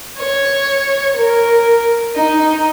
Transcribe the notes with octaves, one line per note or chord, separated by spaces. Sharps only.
C#5
A#4
D#4